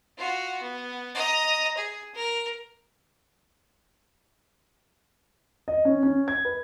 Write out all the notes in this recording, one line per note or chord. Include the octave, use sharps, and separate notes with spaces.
F4 F#4
B3
D#5 A#5
G#4
A#4
D#5
C#4
C#4
G#6
B4